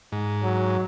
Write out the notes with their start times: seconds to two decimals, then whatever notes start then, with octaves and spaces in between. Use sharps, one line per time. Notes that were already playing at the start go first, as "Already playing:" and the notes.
0.12 G#2
0.44 F#3